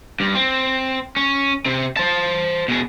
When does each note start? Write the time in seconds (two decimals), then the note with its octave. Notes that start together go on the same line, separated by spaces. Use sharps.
0.20 G2
0.35 C4
1.17 C#4
1.66 C3 C4
1.97 C5 A5
2.68 B2 G#4